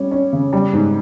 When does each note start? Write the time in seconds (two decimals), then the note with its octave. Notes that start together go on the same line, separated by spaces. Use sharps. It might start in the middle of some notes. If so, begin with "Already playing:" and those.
Already playing: G3 C#4
0.11 C#4
0.33 C#3
0.53 G3
0.73 G#2